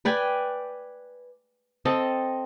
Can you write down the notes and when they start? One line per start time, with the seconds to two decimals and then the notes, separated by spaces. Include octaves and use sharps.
0.05 B4 D5 G5 G#5
1.85 C4 A4 D#5 A5